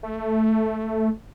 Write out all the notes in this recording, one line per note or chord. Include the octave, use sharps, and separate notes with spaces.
A3